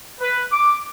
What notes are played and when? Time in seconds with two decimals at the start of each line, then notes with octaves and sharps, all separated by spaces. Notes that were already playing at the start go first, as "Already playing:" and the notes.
0.20 B4
0.52 D6